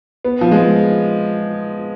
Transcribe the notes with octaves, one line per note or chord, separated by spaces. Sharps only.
B3
F3
G#3